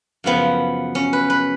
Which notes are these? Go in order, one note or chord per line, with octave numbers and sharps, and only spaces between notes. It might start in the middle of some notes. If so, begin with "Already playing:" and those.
F#2 C#3 F3 B3
C#4
B4
B4